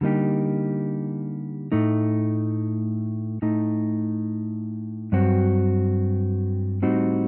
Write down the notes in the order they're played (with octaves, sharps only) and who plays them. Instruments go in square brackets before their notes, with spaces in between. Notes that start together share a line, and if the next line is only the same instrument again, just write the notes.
[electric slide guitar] D3 G3 A#3 D#4 G4
A2 A3 D#4
A2 A3 D#4
G2 F#3 C4 F#4
A2 G3 C4 D#4 F#4